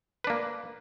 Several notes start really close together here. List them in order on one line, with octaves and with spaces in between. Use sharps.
B4 D4 A#3